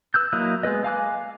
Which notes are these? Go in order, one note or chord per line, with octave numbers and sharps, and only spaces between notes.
B4 E6 F#6 G6
F#3 A#3 E4 D#5 F#6
G#3 B3 B4 D#5
F5 G#5 D6 F#6